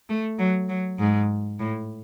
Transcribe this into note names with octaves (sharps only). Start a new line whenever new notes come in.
A3
F#3
F#3
G#2
A2